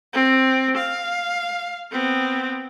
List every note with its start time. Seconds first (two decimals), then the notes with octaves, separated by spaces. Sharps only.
0.13 C4
0.77 F5
1.92 B3 C4